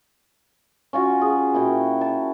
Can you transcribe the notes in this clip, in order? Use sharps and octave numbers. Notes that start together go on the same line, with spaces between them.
C#4 F4 F#4
G#4
A#2 E4 F#4 G5
A5